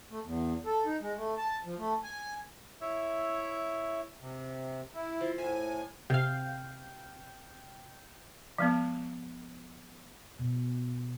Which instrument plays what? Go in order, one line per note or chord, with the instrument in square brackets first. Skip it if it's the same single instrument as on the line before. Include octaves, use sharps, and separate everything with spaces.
[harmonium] A3
E2
A4
D#4
G#3
A3
A5
F3
A3
G#5
[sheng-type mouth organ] E4 C#5 E5
[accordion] C3
E4
[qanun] F3
[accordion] A2 G#5 [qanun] E5
[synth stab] C3 F5 [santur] G5
[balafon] F3 G#3 B3
[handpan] B2